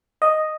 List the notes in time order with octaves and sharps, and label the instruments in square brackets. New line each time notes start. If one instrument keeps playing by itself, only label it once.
[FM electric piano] D#5